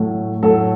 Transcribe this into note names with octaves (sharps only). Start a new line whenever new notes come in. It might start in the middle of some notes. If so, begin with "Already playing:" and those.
Already playing: A2 F#3 A3
A2 F#3 A3 A4